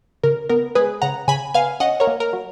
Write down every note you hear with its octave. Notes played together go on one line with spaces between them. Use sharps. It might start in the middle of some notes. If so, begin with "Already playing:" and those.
C#3 A#4
B3 A#4
G#3 G#4 B4
C#3 F#5 A#5
C#3 G#5 B5
B3 F5 G#5
C#4 D#5 F#5
A#4 C#5
A#3
A#4
F#3